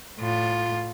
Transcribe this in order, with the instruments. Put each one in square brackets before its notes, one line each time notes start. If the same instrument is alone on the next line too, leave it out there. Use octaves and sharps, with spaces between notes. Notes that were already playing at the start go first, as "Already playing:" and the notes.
[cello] A2 F4